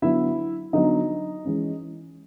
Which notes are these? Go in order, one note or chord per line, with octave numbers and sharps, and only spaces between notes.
D3 F#3 B3 E4 E5
D3 F#3 B3 D#4 D#5
E3 G#3 C#4